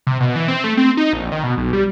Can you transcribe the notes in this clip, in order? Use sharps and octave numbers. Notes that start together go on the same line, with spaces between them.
C3
B2
E3
C4
A3
C4
D#4
A#1
D#3
B2
B1
G3